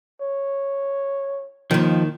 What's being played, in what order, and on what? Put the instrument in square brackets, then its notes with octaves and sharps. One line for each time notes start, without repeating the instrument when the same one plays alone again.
[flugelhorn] C#5
[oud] D#2 D#3 [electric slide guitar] F3